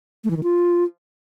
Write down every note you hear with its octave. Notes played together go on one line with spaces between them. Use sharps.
A3
E3
D#3
F4